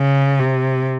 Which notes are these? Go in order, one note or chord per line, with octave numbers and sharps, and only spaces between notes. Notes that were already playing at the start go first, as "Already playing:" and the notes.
Already playing: C#3
C3